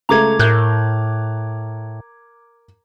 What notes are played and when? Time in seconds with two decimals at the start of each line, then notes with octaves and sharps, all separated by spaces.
0.09 C#2 A3 A#5 D6 G#6
0.39 A2 A#4 F#6 G6